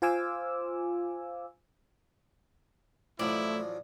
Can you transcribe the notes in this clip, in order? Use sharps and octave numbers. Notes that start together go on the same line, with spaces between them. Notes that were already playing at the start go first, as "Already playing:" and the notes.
F4 C5 F5 G#5 D6 E6
A1 F3 F#3 A3 E4 D5